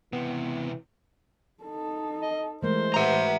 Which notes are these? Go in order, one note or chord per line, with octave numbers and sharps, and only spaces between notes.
C#2 C3 E3 B3
D#4 A4
D#5
E3 G#3 A3 A#4 C5
B4 E5 F#5 A#5